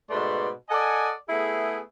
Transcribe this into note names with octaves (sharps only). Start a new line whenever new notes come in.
G#2 B2 A3 B4 D5 C6
A4 D5 D#5 F#5 G#5
A3 B3 E4 G#4